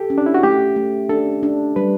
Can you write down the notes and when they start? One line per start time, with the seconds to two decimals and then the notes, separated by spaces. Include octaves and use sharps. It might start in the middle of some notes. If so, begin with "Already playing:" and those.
Already playing: G4 A4
0.10 C#4
0.18 D4
0.26 E4
0.34 F#4
0.43 A3 G4
0.76 A3
1.09 D4 A4
1.43 D4
1.76 G3 B4